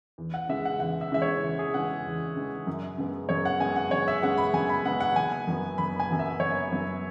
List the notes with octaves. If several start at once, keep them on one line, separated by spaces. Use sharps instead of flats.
E2
F#5
C#3 E3 G#3 E5
F#5
E2 F#5
E5
C#3 E3 G#3 E5
C#5
E2
G#4
C#3 E3 G#3 F#5
E2
C#3 E3 G#3
F#2
C#3 G#3 B3
F#2 C#5
F#5
C#3 G#3 B3 G#5
F#5
F#2 C#5
E5
C#3 G#3 B3 F#5
B5
F#2 G#5
B5
C#3 G#3 B3 F#5
F#5
F#1 G#5
F#2 F#3 B3
F#1 B5
G#5
F#2 F#3 B3
E5
F#1 C#5
F#2 F#3 B3